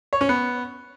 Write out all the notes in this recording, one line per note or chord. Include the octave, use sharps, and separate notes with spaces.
C#5
C#4
B3